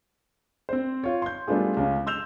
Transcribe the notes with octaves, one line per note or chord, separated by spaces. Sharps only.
C4 C5
F4 C#5
C6 G6
G3 A3 B3 D4 F4 G#4
C#2 C#4
C6 E6 G6 E7 F7